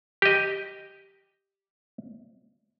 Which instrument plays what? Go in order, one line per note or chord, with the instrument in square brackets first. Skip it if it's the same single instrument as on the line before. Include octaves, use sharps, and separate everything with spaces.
[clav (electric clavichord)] G4 D#5